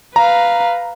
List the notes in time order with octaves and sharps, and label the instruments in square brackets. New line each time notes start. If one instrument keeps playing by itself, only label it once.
[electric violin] B4 F5 [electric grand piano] A#5